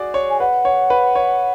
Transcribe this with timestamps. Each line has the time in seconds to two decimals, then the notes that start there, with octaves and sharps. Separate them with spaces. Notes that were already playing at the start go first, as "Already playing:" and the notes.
Already playing: F#4 G#4 D5
0.14 C#5
0.30 G#5
0.39 B4 F#5
0.65 C#5
0.90 B4
1.15 C#5